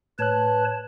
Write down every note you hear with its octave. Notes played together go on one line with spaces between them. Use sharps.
A2 B4 C#5 A5 F#6